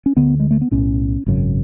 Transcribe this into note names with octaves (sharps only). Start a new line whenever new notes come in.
C#4
D2 D3 B3
G#3
A3
B3
B1 A2 C#4
G#1 F#2 C#3